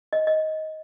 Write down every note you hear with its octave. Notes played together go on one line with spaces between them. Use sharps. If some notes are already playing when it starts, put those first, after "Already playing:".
D#5
D#5